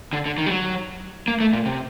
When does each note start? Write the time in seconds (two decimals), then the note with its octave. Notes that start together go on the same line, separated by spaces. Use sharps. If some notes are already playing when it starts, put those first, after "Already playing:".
0.13 D3
0.26 D3
0.38 D#3
0.46 G3
0.51 F#3
1.28 A#3
1.40 A3
1.53 A#2
1.66 C3